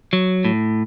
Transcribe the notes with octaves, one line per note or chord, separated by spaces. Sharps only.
F#3
A2